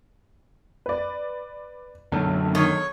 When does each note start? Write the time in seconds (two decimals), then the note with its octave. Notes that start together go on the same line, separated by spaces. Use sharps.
0.86 B4 D5
2.12 B1 F#2 D3
2.55 D#3 C#5